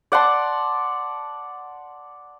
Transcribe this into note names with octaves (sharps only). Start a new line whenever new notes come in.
D5 F#5 A5 C6